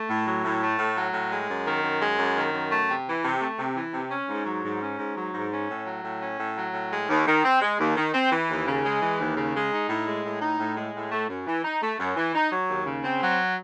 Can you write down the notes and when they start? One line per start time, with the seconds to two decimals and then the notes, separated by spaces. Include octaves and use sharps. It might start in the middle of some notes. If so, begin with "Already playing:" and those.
Already playing: A3
0.09 A2
0.26 F#3
0.44 A2
0.62 A3
0.79 A2
0.96 F#3
1.13 A2
1.31 G#3
1.49 F#2
1.66 D#3
1.83 F#2
2.02 G#3
2.19 F#2
2.36 D#3
2.53 F#2
2.71 A3
2.89 C3
3.07 E3
3.24 C3
3.41 A3
3.58 C3
3.76 E3
3.94 C3
4.11 C#4
4.28 G#2
4.46 F#3
4.63 G#2
4.81 C#4
4.98 G#2
5.16 F#3
5.34 G#2
5.51 C#4
5.69 A2
5.86 F#3
6.04 A2
6.22 C#4
6.39 A2
6.56 F#3
6.73 A2
6.91 G#3
7.09 D#2
7.27 D#3
7.44 C4
7.61 G#3
7.79 D#2
7.96 D#3
8.14 C4
8.32 E3
8.49 D#2
8.67 C#3
8.84 G#3
9.01 E3
9.19 D#2
9.37 C#3
9.54 G#3
9.71 D#4
9.89 A2
10.07 G#3
10.24 A2
10.41 D#4
10.59 A2
10.76 G#3
10.94 A2
11.11 A3
11.29 F#2
11.47 E3
11.64 D#4
11.82 A3
11.99 F#2
12.17 E3
12.35 D#4
12.52 F#3
12.70 D#2
12.86 C#3
13.05 C4
13.22 F#3